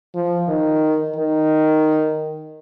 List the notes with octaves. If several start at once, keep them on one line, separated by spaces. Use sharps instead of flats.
F3
D#3
D#3